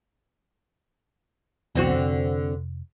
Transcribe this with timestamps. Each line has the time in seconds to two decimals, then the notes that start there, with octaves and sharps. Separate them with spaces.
1.75 B1 E2 D3 C4 F#4
1.93 F1